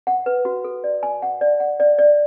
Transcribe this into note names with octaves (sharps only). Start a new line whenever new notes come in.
F#5
B4
F#4
A4
D5
G#5
F#5
D5
F#5
D5
D5